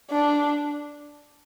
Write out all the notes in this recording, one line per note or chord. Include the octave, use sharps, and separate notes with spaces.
D4